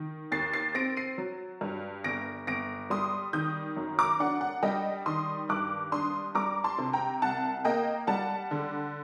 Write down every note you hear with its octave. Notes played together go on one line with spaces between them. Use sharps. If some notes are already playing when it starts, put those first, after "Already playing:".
Already playing: D#3
D#2 A6 C7
A6 C7
C4 A#6 D7
C7 D#7
F#3
G2
G1 A#6 D7
G1 A#6 D7
G3 C6 D#6
D#3 D#6 G6
F#2
A#5 D6
D4 F#5
F#5
G3 D#5 G5
D#3 C6 D#6
G2 D6 F#6
D4 C6 D#6
G3 A#5 D6
A5 C6
C3
G5 A#5
C2 F#5 A5
A#3 D#5 G5
G3 F#5 A5
D3